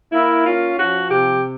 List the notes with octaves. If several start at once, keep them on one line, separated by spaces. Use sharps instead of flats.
A#3 E4
C#4 F4
F3 F#4
C3 G4